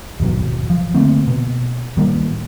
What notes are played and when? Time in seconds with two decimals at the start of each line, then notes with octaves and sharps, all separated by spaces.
0.20 D#1 G#1 B2 F#3
0.70 F3
0.95 D3 A3 A#3 C4
1.28 B2
1.97 A2 D#3 G3 A#3